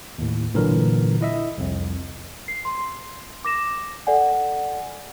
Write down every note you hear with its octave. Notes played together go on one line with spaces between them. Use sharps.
D#2 A2
G1 A#2 D3 E3 F#3 A#4
E4 D#5 E5
C2 F2
C7
C6
D6 A#6 E7
A4 D5 F#5 G#5